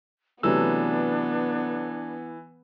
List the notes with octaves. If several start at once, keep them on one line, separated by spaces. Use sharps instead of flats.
C3 E3 F#3 A3 B3 D4 E6